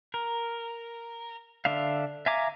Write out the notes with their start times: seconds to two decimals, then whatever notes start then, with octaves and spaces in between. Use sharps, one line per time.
0.14 A#4
1.65 D3 D4 E5 F5
2.26 E5 F5 G#5 A#5 D6